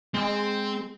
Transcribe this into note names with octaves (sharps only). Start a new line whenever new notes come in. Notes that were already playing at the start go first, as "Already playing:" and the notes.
G#3 C4